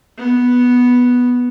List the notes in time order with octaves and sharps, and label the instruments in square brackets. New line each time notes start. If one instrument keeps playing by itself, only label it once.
[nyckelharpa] B3